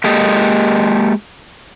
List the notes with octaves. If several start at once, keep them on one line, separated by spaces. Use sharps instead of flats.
G#3 A#3 G4 A4 D#5